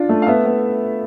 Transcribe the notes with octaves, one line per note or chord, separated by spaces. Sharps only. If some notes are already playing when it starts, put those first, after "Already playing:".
Already playing: D4 F4
A3
F5
B3 E5
B3